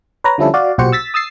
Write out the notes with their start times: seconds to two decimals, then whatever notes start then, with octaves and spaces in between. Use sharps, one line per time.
0.24 B4 C#5 A#5
0.38 D3 F3 G3 C#4 E4 A4
0.54 F#4 D5 F5
0.78 B1 A#2 F#4 G4 C5 C#7
0.92 E6 A6 B6
1.14 D#6 E6 A6 C7